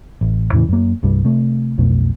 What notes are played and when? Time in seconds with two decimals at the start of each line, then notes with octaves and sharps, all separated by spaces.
0.21 A1
0.52 E2 A2 C#3 E3
0.68 F#2 A#3
1.03 C2 G2 G3
1.24 C3 A3
1.78 B1 F2 B2 A3